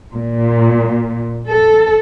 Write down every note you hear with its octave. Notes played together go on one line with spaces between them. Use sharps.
A#2
A4